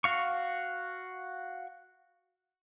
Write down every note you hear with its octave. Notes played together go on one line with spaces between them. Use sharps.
F#4 F5 C#6